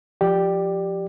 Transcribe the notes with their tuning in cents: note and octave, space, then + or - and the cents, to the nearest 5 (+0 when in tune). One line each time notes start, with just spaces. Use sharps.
F3 +0 G4 -5 D5 +15